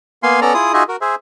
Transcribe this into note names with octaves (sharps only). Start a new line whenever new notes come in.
A#3 B3 F5 G#5 C6
B3 C#4 A4 D5 A#5
E4 F4 G#4 D#6
D#4 F4 F#4 G#4 D#5 E5
F#4 A#4
G#4 C5 E5